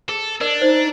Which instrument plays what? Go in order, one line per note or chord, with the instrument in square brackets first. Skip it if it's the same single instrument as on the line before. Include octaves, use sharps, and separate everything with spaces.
[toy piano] G#4 [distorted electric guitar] A4
[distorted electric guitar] D4 [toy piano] A#4 D5
[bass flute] D#4 [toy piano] C5 D5